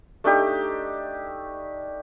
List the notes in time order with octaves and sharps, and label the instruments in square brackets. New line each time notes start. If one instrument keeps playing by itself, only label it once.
[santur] A3 D4 D#4 G4